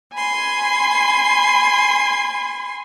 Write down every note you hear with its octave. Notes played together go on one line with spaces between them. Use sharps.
G#5 B5 C6